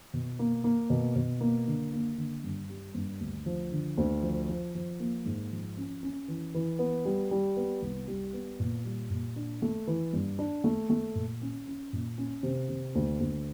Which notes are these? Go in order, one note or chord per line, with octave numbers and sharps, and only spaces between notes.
B2
A#3
A#3
B2
B2
A#3
D3
A#3
D3
G2
G3
G2
D2
F3
D3
D2
F3
F3
F3
A#3
G#2
F3
C#4
C#4
E3
E3
B3
G3
G3
B3
C2
G3
B3
A#2
G3
A#2
D4
A3
E3
G2
D4
A3
A3
A#2
C#4
C#4
A#2
C#4
C3
C3
D2
D2